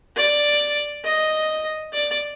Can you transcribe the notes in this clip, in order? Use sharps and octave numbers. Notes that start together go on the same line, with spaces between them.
D5
D#5
D5